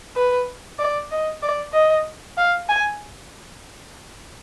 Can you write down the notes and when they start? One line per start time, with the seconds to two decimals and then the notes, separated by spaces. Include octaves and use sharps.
0.16 B4
0.79 D5
1.11 D#5
1.42 D5
1.73 D#5
2.37 F5
2.69 G#5